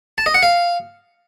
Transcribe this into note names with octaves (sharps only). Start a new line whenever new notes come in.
A5
D#5
F#5
F5